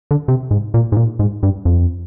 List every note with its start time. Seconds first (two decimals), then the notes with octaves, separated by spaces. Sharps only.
0.11 D3
0.28 C3
0.51 G#2
0.74 A#2
0.92 G#2
0.97 A#2
1.19 G#2
1.43 G2
1.65 F2